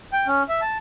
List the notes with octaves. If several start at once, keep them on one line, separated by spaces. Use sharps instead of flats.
G5
C#4
E5
A5